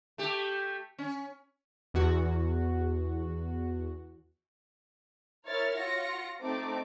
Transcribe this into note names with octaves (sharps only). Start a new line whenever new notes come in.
A3 G4
C#4
E2 F#4
E4 A#4 C#5 E5 F6 A6
F4 F#4 A#6 C#7
A3 C4 D#4 A5 D6